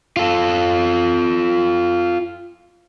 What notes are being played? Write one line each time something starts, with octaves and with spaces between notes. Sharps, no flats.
F4 A4